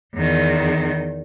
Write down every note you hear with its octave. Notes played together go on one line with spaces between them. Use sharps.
E2 D#3